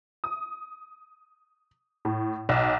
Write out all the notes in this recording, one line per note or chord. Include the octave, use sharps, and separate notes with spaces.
D#6
A2
B1